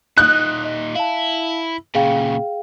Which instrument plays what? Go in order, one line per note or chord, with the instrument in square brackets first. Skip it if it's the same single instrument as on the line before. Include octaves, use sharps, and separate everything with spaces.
[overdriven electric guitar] A#2 D#4 [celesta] D#6 [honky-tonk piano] F#6
[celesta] D#5
[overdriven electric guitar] E4 [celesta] F5 A5
[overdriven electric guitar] A#2 C#3 [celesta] G#4 F5 G5